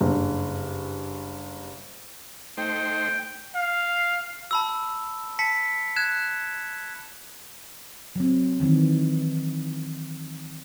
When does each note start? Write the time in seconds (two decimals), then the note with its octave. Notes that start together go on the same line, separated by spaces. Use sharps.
0.01 F#1 G2
2.57 A3 D#4 C5 G5
3.55 F5
4.51 A5 B5 E6
5.39 A5 B6 C#7
5.96 F#6 G#6 E7
8.16 F#3 C4
8.60 D#3 E3 C4